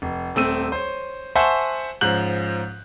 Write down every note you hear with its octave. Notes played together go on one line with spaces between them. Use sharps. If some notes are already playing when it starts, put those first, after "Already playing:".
F1
D#1 A3 C4 E6 D#7
C5 C#5
C5 E5 F#5 G#5 A5 C#6
G#2 F3 C#4 F#6 G6 F#7